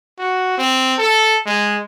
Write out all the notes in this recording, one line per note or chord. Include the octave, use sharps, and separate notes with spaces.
F#4
C4
A4
G#3